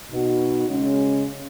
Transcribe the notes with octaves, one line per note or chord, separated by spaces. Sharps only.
B2 B3 D#4 F#4
C#3 G#3 C#4